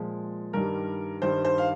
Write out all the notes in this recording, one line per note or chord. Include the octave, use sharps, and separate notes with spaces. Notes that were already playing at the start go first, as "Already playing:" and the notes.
Already playing: A#2 F3 G#3
G2 D#3 G3 A#4
G2 D#3 G3 C5
C5
F5